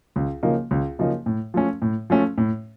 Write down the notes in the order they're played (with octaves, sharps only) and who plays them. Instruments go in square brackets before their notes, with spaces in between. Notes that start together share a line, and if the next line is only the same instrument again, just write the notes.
[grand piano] C#2
C#3 F3 A#3 D#4
C#2
C#3 F3 A#3 D#4
A2
F3 A3 C#4
A2
F3 A3 C#4
A2